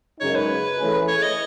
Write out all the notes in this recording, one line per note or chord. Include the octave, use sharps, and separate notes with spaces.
F#2 C#3 G#3 D#4 C#5
B4
E3 A3 C#4 G#4
C#5
D#5